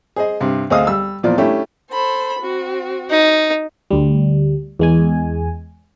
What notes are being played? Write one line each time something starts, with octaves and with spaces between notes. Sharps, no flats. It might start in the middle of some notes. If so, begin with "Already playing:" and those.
G#4 C5 D#5
G2 C3
D2 C4 G#4 D#5 F5 D#6
G3 E6
E2 A#2 F3 F4 D5
A3 C#4 D4 E4 G4
A4 C5 B5
C4 F#4
D#4
D2 G3
E2 G#3 G#5